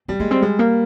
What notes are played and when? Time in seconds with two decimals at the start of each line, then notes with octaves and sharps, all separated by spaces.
0.08 G3 C4
0.20 G#3 A#3
0.31 G3 C4
0.42 G3 G#3
0.59 A#3